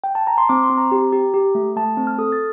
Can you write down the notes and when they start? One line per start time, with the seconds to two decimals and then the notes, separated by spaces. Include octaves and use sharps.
0.04 G5
0.15 A5
0.27 A#5
0.38 C6
0.49 C4 D6
0.63 C6
0.70 C4
0.78 A#5
0.92 G4
1.12 G4
1.34 G4
1.55 A3
1.76 A3 A5
1.97 C4
2.07 F6
2.18 A4 D#6
2.32 A6